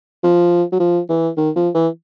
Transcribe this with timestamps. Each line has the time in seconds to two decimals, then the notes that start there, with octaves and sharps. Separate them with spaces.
0.24 F3
0.72 F#3
0.80 F3
1.09 E3
1.37 D#3
1.56 F3
1.75 E3